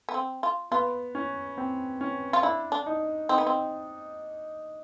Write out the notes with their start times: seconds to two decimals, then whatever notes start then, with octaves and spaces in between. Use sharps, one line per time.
0.09 B3
0.14 C4
0.43 F4
0.71 B3 F4
1.15 C#4
1.58 C4
2.01 C#4
2.33 F4
2.43 D4 E4
2.72 D4
2.86 D#4
3.29 C4 D#4
3.38 B3
3.47 C4